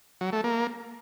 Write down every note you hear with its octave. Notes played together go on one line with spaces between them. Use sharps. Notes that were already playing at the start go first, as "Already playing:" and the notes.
F#3
A3
A#3